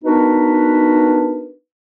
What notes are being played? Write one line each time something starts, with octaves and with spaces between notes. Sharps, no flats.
B3 D4 D#4 F#4 A#4 B4